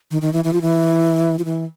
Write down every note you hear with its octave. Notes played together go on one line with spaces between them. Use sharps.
D#3
D#3
E3
E3
F3
E3
F3
E3